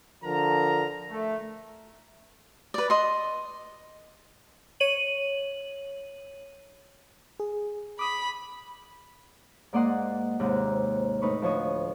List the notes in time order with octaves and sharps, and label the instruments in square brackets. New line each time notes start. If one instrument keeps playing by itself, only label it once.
[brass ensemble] D3 F3 A#4 A#5
A3
[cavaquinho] B4 D5
D#5 C6
[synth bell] C#5 D#7 F#7
[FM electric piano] G#4
[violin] B5 [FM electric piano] D6 D#6
[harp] G#2 A#3 D5 D#5 F#5 C6
D#2 G#2 C3 F#6
A2 D#4 B4 C#6
D2 F3 C#5 D#5 C#6